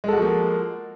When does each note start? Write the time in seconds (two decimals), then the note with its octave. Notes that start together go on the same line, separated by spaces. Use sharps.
0.04 G#3
0.08 A4
0.13 F#4
0.18 F3
0.22 A#3